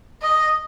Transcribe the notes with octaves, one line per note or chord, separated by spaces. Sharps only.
D#5